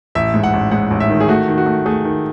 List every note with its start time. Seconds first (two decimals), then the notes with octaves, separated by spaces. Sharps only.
0.15 A1 E5
0.34 G#2
0.43 F#5
0.53 A1
0.71 G#2 F#5
0.91 A1
1.00 E5
1.09 D#3
1.20 G#4
1.28 A3 F#4
1.48 D#3
1.58 F#4
1.66 A3
1.86 A3 G#4
2.05 D#3